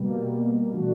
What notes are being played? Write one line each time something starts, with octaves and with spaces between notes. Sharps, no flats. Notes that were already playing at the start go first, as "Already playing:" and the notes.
Already playing: B2 G3 A#3
E3 A3 D4 F#4